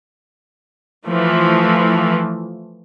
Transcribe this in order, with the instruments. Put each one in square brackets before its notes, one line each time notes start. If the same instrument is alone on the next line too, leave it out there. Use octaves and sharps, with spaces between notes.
[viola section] E3 F3 A3